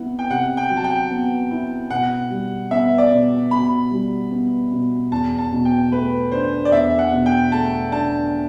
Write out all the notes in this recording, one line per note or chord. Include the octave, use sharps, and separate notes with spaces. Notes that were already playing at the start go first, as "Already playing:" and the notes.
Already playing: C3 B3 E4 F#5
G5
C3 F#5
G5
F#3
A5
G5
B3
E4
B2 F#5
G3
B3 E5
D5
B2
B2 B5
G3
B3
B2
E2 A5
A5
B2
G5
A3 B4
D4 C5
D5
E2 E5
F#5
B2
G5
A3 A5
D4 A5